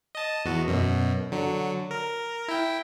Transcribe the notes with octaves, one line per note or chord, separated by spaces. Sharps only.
D#5 A5
E2 F#4
F#2 B2
D3 F#3
A#4
E4 G5